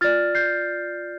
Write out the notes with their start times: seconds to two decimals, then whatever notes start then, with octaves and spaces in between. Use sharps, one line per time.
0.01 F4 D5 F6 A6
0.35 G6 C7